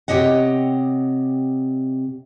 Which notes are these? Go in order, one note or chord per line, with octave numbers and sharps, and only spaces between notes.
C3 G4 C#5 D#5 F#5